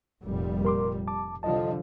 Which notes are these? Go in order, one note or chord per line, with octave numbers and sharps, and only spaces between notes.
F1 A#2 G3
A#4 C6 D6
A5 D6
C2 D3 F3 D#5 A5